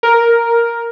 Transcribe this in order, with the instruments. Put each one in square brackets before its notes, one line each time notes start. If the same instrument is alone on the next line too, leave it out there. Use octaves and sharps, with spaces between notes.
[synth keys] A#4